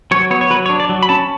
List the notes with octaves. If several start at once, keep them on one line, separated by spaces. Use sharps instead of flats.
F#3 C#5
B3 C#5
C#5
F#3 B4
C#5
D4
D5
F#3
B5
C#4 A5